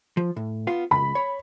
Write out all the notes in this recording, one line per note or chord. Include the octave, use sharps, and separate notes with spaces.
F3
A2
B3 F4 F5
C#2 B5
C#5